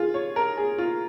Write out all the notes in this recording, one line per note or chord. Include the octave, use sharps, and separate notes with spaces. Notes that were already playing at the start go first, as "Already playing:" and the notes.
Already playing: F4 G#4
C#5
A#4
G#4
F4